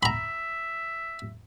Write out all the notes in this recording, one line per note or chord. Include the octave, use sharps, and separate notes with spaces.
E5 A#5 B5